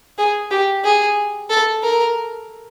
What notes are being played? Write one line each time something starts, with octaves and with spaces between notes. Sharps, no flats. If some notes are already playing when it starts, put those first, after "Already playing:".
G#4
G4
G#4
A4
A#4